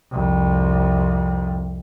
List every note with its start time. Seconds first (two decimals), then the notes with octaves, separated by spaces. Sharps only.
0.12 C2 F2